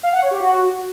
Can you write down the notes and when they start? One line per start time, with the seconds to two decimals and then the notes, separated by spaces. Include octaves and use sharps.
0.03 F5
0.13 F#5
0.22 C#5
0.31 G4
0.40 F#4